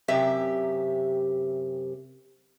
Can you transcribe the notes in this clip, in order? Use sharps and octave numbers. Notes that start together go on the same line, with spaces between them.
F#2 C3 G4 E5